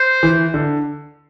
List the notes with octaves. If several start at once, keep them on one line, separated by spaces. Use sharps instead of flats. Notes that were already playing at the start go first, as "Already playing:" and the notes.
Already playing: C5
E3
D3